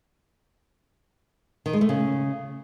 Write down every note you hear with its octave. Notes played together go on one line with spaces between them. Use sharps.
D#3
G#3
A3
C#3